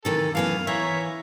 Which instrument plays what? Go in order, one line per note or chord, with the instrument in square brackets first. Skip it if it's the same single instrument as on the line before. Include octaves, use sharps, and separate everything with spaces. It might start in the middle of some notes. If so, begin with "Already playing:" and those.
[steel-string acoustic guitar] C3 D#3 E3 [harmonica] A4
[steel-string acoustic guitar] F#2 E3 B3 [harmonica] F5
[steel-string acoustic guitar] E3 [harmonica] C#5 E5 A#5